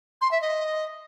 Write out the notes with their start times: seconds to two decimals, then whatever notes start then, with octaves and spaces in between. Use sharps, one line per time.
0.21 C6
0.31 E5
0.41 D#5